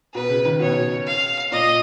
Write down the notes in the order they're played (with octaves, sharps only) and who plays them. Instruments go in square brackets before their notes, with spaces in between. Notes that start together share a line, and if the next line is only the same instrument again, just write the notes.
[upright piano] B2 [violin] B4
[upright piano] C#3
D#3
[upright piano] B2 [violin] C#5
[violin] F5
[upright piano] A#2 [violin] D#5